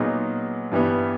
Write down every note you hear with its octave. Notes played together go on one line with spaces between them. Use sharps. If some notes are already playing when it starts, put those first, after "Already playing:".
Already playing: A#2 F#3 B3 D#4 G#4
G2 E3 G3 B3